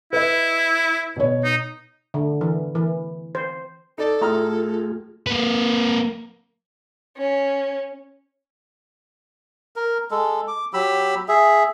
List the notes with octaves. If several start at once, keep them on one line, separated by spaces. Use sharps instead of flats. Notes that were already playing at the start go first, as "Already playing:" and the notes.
E4 B4 D#5
B2 C#5
D#4
D3
E3
E3
C5
D#4 A4 D5
A2 A3 F4 G#4 A#5 F6
A#3 B4
C#4
A#4
G#3 A4
D6
F#3 G4 B5 E6
G#4 E5